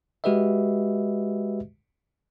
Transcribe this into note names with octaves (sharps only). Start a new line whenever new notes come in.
G#3 F#4 G4 B4 D#5 E5